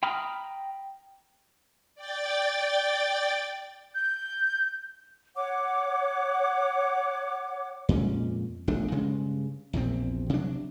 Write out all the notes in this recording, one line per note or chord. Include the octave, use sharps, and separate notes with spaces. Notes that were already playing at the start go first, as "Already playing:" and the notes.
G5 A#5 B5 D#6 F6
D5 G5 A6
G6
C#5 F#5 D6
F2 A#2 G#3 C#4
E1 A#1 A3 D4
G2 C#3 G#3
A#1 E2 A#2 C4
C3 F#3 D4